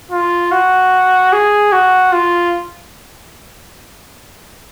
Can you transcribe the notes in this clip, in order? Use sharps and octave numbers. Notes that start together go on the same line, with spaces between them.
F4
F#4
G#4
F#4
F4